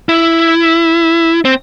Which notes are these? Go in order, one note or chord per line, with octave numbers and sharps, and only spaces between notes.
E4
C4